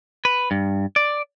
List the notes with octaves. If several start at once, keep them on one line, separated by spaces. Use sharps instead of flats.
B4
G2
D5